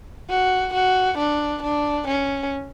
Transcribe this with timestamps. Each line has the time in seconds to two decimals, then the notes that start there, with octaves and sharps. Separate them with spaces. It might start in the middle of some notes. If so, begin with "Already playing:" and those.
0.30 F#4
0.74 F#4
1.18 D4
1.63 D4
2.07 C#4